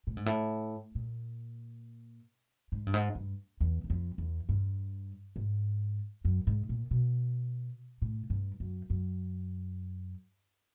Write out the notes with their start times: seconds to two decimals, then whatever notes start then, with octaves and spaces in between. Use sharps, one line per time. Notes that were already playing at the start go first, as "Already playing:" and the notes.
0.07 A2
0.17 G#2
0.26 A2
0.95 A#2
2.72 G#2
2.87 G2
2.94 G#2
3.15 G2
3.61 E2
3.84 E2
3.90 F2
4.18 E2
4.49 G2
5.36 G#2
6.25 F#2
6.47 G#2
6.69 A#2
6.91 B2
8.02 A2
8.30 G2
8.60 F#2
8.90 F#2